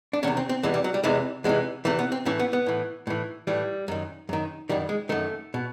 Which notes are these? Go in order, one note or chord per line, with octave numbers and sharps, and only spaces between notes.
D4
E2 C3 D#3 C#4
C4
C4
E2 C3 E3 G#3
G3
F#3
G3
E2 C3 E3 G#3
E2 C3 E3 G#3
E2 C3 E3 A3
B3
C4
A2 E3 C#4
B3
B3
A2 E3
A2 E3
A2 E3 G3
F#2 D#3
F#2 D#3
F#2 D#3 G3
G#3
F#2 D#3 A3
B2